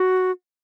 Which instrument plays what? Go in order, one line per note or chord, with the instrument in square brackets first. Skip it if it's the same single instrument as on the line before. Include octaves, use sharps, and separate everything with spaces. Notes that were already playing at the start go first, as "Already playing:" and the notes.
Already playing: [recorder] F#4